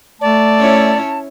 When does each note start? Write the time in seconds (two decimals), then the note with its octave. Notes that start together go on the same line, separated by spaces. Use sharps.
0.21 A3 D5 A5
0.59 C#4 E4 C#5